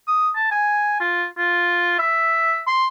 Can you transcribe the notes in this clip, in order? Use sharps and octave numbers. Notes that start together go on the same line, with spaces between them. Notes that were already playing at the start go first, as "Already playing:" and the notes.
D#6
A5
G#5
F4
F4
E5
C6